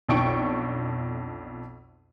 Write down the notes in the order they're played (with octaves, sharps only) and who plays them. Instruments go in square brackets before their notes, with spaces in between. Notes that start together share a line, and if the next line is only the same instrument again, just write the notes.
[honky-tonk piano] B1 F2 D4 G5 C#6 D7